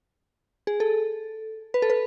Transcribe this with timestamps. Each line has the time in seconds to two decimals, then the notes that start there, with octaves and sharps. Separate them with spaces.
0.67 G#4
0.80 A4
1.74 B4
1.82 A4
1.90 B4